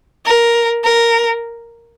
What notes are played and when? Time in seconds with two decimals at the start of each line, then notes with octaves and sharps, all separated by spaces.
0.25 A#4
0.84 A#4